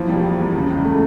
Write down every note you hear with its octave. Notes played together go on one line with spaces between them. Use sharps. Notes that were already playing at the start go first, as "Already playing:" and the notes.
Already playing: E3 F3
E1 G3
E1
E2
C#3
C#2
A3